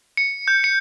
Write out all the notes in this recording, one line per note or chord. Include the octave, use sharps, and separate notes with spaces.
C#7
G6
C#7